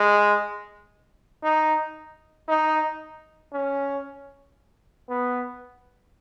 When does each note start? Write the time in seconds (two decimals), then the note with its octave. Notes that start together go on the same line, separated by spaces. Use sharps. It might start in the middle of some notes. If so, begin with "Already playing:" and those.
Already playing: G#3
1.43 D#4
2.48 D#4
3.53 C#4
5.09 B3